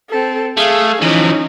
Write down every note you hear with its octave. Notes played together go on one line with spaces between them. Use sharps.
C4 A4
A3 G#4 F5
E3 F3 C#4 D#4